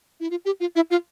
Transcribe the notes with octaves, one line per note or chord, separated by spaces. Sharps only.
E4
F4
G4
F4
E4
F4